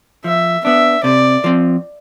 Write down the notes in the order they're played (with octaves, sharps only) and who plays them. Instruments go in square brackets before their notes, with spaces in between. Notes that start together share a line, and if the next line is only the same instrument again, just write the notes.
[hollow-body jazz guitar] F3 [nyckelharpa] E5
[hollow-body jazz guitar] B3 D4 [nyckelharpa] E5
[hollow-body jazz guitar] C3 [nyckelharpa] D5
[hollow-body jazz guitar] F3 C4